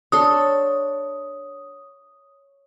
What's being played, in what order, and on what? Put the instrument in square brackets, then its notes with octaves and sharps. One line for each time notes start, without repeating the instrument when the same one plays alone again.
[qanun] D4 A4 C6 [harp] C#5 [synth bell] D#6